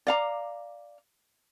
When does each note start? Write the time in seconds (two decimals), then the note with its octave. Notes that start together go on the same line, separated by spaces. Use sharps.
0.07 D5 F5 A#5